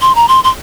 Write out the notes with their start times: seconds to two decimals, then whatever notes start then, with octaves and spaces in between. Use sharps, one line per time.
0.02 C6
0.15 A#5
0.28 C6
0.44 C6